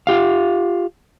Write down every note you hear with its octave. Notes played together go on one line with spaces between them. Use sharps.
F4 G4 F5